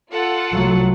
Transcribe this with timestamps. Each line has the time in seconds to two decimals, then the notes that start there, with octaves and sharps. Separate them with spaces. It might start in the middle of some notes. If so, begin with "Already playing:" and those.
0.13 F4 A4 F#5
0.52 C2 F#3 A3